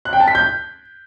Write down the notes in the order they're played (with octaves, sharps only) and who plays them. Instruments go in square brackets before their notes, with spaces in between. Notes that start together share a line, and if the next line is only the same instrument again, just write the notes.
[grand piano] F#6
G5
A5
B6
G6